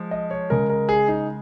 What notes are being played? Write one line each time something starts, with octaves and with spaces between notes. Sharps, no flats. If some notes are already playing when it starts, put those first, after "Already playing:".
Already playing: F3 G#3
D#5
C#5
C#3 G#3 A#4
A#4
G#4
D#4